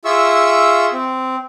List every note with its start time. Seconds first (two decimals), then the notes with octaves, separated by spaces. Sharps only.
0.05 F4 G#4 E5 C#6 E6
0.93 C4